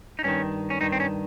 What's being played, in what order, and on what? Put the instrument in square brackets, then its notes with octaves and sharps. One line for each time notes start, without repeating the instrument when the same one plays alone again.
[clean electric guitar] D#4
G2 D#3 C#4
C#4
G2 D#3 D#4
C4
C#4